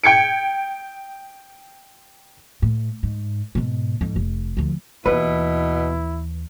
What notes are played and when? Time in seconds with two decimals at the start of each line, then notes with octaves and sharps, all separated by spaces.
0.04 G5 G#6 C#7 D7
2.62 A2
3.03 G#2
3.55 G#2 B2
4.01 F2 G#2
4.16 F1
4.57 D2 F3
5.06 D#2 B2 E3 E4 B4